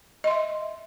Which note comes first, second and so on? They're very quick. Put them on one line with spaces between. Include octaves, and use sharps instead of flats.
D#5 C6 E5